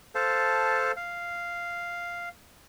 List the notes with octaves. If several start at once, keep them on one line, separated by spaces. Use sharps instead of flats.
A4 C5 F5 A5
F5